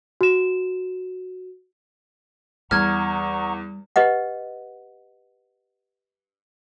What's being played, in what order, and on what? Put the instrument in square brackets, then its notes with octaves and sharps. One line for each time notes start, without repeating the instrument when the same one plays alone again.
[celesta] F#4 E7
[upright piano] E2 [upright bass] G3 [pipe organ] F#5 A#5 C#6 [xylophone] F6 G#6
[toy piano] G4 B4 D#5 F#5